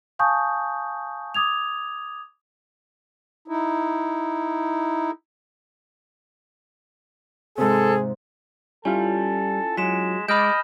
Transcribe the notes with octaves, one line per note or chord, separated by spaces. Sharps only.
F5 G#5 A5 C#6 D#6 G6
D6 D#6 G#6 F7
D#4 E4
G#2 C3 G#4 A4
G3 C#4 E4 F4 A4 G#5
F#3 G#3 B6 E7
G#3 D#5 B5 D6 F6 G6 A6 D7